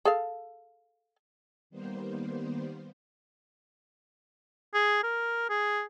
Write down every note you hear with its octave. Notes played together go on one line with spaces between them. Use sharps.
G#4 A4 F5
D#3 G3 A#3 B3 C5
G#4
A#4
G#4